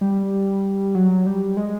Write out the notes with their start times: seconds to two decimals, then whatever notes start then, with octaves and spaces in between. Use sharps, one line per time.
0.01 G3
0.95 F#3
1.26 G3
1.57 G#3